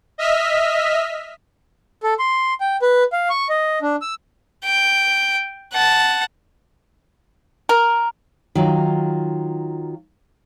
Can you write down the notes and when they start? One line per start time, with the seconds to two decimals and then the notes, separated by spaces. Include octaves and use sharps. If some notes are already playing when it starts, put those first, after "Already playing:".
0.18 D#5 E5 F6 B6
2.03 A4
2.19 C6
2.61 G5
2.82 B4
3.13 F5
3.30 C#6
3.49 D#5
3.82 D4
4.02 E6
4.64 G5
5.73 F#5 A5
7.69 A#4
8.55 D#3 F#3 F4